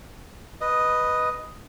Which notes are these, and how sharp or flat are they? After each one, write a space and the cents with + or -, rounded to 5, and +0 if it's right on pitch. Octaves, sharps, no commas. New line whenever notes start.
B4 +0 D#5 +0